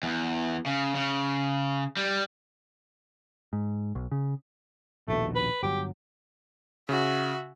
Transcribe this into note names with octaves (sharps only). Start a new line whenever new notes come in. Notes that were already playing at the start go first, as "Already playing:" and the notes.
E2
C#3
C#3
G3
G#2
B1
C#3
A#1 D#2 B2 A3
B4
G1 F#3 G4
C#3 F#4 E5